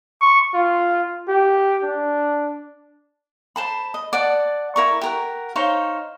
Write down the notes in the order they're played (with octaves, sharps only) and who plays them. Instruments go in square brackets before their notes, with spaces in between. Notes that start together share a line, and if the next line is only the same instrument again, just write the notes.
[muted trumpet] C#6
F4
G4
D4
[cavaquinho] C5 A5 B5
D#5
D5 F#5 A5
E4 A#4 C#6
G4 A#4 F#5
D#4 C5 C#5 F5